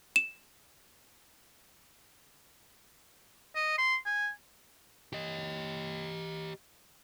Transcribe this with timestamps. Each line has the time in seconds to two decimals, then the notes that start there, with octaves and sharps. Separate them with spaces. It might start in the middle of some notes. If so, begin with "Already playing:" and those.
0.16 E7
3.55 D#5
3.78 C6
4.05 G#5
5.13 G4 D#5